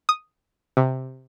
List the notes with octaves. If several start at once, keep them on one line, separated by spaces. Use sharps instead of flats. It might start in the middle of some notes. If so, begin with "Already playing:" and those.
D#6
C3